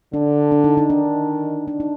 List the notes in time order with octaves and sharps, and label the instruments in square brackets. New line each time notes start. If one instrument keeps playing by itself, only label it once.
[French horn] D3 [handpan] D4
[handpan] D4
D#4
D#4
[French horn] D#3 [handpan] D4
[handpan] D4
D#4